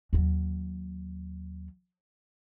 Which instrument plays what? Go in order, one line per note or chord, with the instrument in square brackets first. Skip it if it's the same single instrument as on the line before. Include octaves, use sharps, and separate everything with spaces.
[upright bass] D#2 F#3